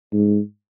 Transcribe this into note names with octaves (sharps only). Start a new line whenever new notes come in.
G#2